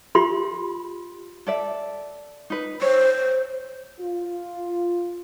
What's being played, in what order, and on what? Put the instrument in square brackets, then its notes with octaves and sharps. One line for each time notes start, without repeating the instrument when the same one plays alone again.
[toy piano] F4 G4 B5 C6
[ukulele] A4 D5 E5
D#4 B4
[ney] C5 [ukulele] C#5
[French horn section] F4